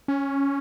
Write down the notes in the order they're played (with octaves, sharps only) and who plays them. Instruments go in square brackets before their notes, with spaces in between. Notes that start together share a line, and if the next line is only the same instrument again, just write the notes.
[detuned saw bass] C#4